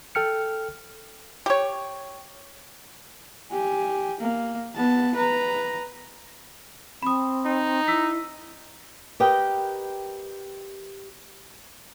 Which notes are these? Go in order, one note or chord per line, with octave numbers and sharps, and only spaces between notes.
A4 G5 F6 C#7
G4 C#5
G4 G#5
A#3
B3 A5
B4 A#5
C4 B5 D#6
D#4
E4 E6 B6
G4 A#4 B4 D#5 G5